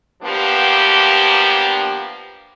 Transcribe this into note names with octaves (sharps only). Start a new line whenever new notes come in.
F3 G3 A#3 B3 D4 G4